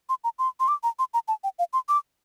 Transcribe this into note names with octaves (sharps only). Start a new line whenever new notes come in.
C6
A#5
C6
C6
D6
A#5
C6
A#5
A5
G5
F5
C6
D6